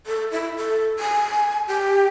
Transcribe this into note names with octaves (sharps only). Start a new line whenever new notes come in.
A4
E4
A4
G#5
G4